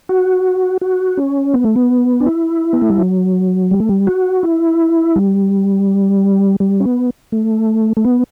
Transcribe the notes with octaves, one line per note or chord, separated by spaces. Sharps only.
F#4
F#4
C#4
B3
A3
B3
D4
E4
B3
A3
G3
F#3
G3
A3
G3
F#4
E4
G3
G3
C#4
B3
A3
A3
B3